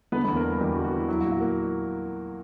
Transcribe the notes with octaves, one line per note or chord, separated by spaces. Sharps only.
D3 B3 B4
E2 B3 B4
A#3 A#4
G3
A#4
E2 G3 G4
F#4
D3
F#4
E2 E4
F#3 E4
F#4
A#2
F#4
A#3